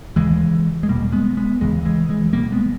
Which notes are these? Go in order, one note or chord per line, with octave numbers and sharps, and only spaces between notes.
D#2 C#3 E3 G#3
G#3
E2 B2 G3 A#3
G#3 B3
G#3 B3
D#2 C#3 E3 G#3
E3 G#3
E3 G#3
C#2 B2 G3 A#3
G#3 B3